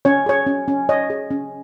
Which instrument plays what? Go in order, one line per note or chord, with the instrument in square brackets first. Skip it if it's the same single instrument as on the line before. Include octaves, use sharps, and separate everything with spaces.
[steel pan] C#4 C#5
G#4 C#5
C#4
C#4
C#5 D#5
G#4
C#4